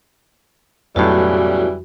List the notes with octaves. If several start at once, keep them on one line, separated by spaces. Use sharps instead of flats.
B1 F2 A2 C#3 E3 F#3 G3 F#4